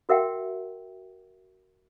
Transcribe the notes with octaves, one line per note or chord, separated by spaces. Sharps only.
F#4 A#4 E5 F#5 G5